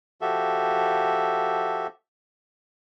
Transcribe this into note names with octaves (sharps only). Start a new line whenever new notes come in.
F3 F#4 G4 A4 E5